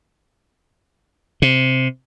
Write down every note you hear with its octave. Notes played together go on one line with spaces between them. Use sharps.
C3